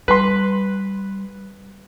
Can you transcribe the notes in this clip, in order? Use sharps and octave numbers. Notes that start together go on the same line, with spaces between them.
G3 B4 C6